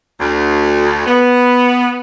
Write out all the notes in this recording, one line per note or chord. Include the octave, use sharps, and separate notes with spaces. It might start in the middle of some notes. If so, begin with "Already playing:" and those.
D2
B3